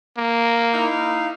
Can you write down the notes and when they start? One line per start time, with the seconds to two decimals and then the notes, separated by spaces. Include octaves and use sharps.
0.17 A#3
0.74 D#4 E4 F5